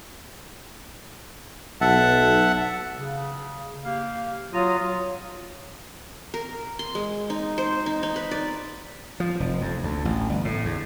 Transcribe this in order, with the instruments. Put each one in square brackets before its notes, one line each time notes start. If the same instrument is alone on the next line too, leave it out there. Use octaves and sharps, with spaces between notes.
[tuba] B1 [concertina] E5 F#5 A5
[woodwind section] C#3
A#3 G4 F5
[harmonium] F#3 F4 [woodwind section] A#5 D#6
[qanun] A#4
C6
G#3
D#4
C5
D#4
D#4
B4
D5
[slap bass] F3
F1
F2
D2
A1
G1
A2
E2